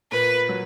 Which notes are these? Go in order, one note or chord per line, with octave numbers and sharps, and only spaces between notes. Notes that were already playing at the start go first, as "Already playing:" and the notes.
A#2 B4
F#3